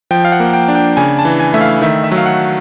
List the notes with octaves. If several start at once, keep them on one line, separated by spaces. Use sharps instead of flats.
F3 G5
F5
F#5
A#3
G5
D4
G5
C#3 G#5
A5
E3
G#5
A3 E5
F5
D#3 E5
E5
F#3
F5
F#5